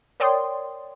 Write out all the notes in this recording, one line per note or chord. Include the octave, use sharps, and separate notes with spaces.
A#4 C#5 D5 G5 C6 D#6